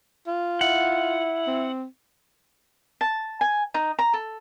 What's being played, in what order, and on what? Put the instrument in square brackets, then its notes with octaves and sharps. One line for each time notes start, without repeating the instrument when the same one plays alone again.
[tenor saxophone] F4
[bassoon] E4 [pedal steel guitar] F#5
[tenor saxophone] C4
[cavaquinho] A5
G#5
D#4
A#5
A4